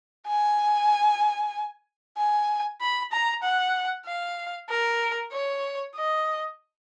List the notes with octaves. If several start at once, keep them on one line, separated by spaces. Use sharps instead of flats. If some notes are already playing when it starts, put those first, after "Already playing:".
G#5
G#5
B5
A#5
F#5
F5
A#4
C#5
D#5